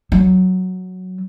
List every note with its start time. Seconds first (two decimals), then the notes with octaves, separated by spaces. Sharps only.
0.12 F#3